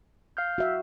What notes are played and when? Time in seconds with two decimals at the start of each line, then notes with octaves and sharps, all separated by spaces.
0.37 F5 F6 G6
0.58 F#4 E5